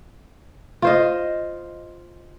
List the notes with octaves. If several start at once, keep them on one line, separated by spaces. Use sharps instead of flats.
F4 C5 D#5